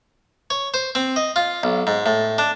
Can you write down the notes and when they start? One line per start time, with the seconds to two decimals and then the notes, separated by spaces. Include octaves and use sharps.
0.50 C#5
0.74 C5
0.95 C4
1.16 D#5
1.36 F4
1.63 B1
1.87 G#2
2.06 A2
2.38 D4